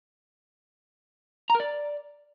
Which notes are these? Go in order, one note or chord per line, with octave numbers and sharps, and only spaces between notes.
A#5
A#4
D5